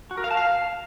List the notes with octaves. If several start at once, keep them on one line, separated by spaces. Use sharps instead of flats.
F#4
A#4
F5
A5
F5